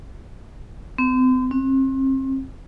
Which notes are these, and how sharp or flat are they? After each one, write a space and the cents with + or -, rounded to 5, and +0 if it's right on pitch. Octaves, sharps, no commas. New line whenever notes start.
C4 -40
C4 +35